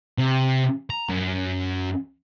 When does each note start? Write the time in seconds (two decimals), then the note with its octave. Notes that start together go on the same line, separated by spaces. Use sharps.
0.18 C3
0.90 A#5
1.09 F#2